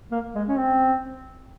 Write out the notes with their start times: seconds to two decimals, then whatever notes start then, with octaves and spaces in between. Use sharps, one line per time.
0.12 A#3
0.35 G#3
0.48 C#4
0.59 C4